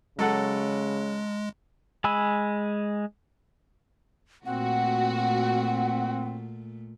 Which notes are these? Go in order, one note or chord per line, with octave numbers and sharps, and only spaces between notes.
C#3 F#3 G#3 A4 F#5
G#3 G#5 B5 E6
A#2 A3 C4 F#4 F#5